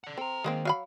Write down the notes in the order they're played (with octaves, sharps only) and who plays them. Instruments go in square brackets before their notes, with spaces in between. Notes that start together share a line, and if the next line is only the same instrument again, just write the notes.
[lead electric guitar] D5 F#5
[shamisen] C4 [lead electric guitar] A4 A#5
[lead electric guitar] D#3 [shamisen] G#3 A#3 C4
[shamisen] F#3 F5 B5